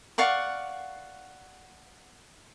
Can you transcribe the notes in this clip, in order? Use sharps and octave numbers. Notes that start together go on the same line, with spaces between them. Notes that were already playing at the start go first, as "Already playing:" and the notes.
D5 F5 F#5 C#6